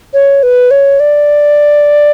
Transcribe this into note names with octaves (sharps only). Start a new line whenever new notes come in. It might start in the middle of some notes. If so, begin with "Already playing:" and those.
C#5
B4
C#5
D5